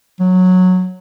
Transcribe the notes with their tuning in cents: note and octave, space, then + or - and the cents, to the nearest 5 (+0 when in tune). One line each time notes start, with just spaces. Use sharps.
F#3 -10